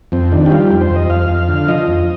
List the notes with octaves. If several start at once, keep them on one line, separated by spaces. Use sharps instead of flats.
F2 C4
D#3 D4
G4
G3 F4
F2 G4
C5
F2
D#5
F2 F5
F2
D3
F3 D#5
F2